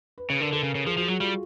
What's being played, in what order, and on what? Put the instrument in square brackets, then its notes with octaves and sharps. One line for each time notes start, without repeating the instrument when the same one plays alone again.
[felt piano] B4
[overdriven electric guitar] C#3 [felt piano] B4
[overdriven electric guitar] D3 [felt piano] A#4
[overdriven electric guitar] D3 [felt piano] A4
[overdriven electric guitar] C#3
C#3
[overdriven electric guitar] F3 [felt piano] G#4
[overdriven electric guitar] F3 [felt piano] F#4
[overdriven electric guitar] F#3 [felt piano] F#4
[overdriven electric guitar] G3 [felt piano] F4